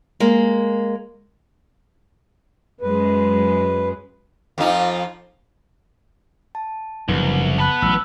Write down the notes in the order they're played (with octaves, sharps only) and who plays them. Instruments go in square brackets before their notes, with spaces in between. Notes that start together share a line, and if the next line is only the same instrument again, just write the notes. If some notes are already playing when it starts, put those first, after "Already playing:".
[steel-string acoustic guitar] G#3 A#3
[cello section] F#2 G#3 [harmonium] B4
[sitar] F2 F3 D#4
[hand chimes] A5
[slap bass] F#1 C#3 F3 [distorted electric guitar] C2 [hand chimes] D#4 B4
[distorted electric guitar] B3 B4 [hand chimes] A5 B5 F#6
[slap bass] A1 F#3 [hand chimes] E6